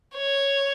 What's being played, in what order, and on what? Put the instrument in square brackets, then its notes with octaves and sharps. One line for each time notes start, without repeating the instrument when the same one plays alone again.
[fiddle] C#5